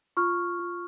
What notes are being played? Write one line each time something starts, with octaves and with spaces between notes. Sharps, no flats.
F4 C#6 F6
F4